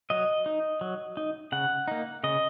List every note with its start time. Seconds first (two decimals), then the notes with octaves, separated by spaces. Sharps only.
0.10 F#3 D#5
0.46 D#4
0.81 F#3
1.17 D#4
1.52 C#3 F#5
1.88 A#3 D#4
2.24 C#3 D#5